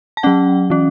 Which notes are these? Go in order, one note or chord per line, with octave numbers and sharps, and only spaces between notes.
A5
F#3 C#4 F#5
E3 C#4